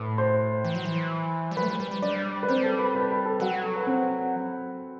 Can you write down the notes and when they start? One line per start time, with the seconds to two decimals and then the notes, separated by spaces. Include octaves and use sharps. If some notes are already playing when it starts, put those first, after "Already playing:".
Already playing: A2 B4
0.18 C5 C6
0.64 E3
0.75 F#3
0.85 E3
1.51 G3
1.57 F#3 B4 B5
1.63 A3
1.68 G3
1.80 G3
1.91 G3
2.02 G3 D4 D5
2.43 B4
2.48 G3 C4 C5
2.63 A4 A5
2.79 B4 B5
2.95 B4 B5
3.11 B4 B5
3.25 A4 A5
3.40 F#3 F#4 F#5
3.64 A4
3.76 B4
3.87 C4 C5